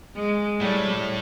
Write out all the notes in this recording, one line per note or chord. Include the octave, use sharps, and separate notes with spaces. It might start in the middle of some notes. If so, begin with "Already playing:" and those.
G#3
A2 G3